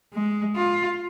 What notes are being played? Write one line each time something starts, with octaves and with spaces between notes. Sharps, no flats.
G#3
F4